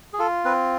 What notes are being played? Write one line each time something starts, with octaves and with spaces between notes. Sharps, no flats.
G#4
F4 A4
C4 B4